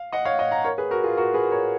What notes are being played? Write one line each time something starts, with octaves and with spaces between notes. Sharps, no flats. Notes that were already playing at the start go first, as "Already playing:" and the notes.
Already playing: F5
D#5 F#5
C#5 F5
D#5 F#5
F#5 A#5
A#4 C#5
G#4 B4
F#4 A#4
F4 G#4
F#4 A#4
G#4 B4
A#4 C#5